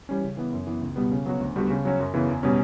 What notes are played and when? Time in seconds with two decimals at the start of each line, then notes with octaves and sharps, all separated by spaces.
0.09 E3 G3 C#4
0.24 C#3
0.37 E3 B3
0.53 F#2
0.67 E3 B3
0.81 C#2
0.96 B2 G3 B3
1.11 C#3
1.26 F#3 B3 F#4
1.40 D2
1.56 D3 G3 B3 F#4
1.70 C#3
1.85 F#3 C#4 F#4
2.00 F#2
2.14 C#3 E3 B3
2.28 E2
2.43 B2 G3 C#4